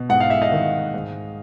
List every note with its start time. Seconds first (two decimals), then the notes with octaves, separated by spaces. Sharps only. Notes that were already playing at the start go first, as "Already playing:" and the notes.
Already playing: B2
0.09 G#2 F#5
0.20 F5
0.30 E5
0.42 D#5 F5
0.52 D#3
0.94 G#2